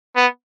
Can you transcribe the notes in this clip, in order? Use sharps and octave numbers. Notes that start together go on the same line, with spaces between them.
B3